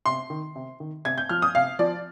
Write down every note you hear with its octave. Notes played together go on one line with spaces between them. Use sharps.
C3 C6
D#3
C3
D#3
C3 G#6
G6
F3 F6
D#6
C3 F5
F3 D5